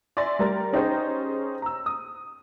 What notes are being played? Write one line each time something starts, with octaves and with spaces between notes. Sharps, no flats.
D5 E5 G#5 C6 A6 A#6
G3 A#4 A6
C#4 D#4 G4 G#4 C5 C#5
A#5 E6
D#6